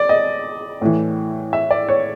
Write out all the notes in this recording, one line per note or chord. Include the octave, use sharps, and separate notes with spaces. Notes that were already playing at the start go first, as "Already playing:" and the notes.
Already playing: D5
D#5
A2 E3
E5
D5
C#5